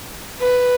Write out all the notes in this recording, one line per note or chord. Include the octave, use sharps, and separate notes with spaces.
B4